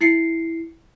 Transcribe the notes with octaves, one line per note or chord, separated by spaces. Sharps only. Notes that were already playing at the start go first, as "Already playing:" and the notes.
E4 C7 C#7